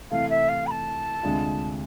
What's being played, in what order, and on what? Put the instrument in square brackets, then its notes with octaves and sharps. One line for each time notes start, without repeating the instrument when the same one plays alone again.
[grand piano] C3 E3 A3 [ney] F5
[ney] E5
F5
B5
A5
[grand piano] D2 C3 G#3 D4 F4